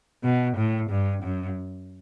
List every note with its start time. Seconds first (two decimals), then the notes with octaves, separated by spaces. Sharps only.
0.24 B2
0.57 A2
0.90 G2
1.23 F#2